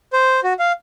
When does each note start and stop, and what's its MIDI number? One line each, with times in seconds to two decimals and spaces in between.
0.13 0.40 72
0.44 0.53 66
0.59 0.72 77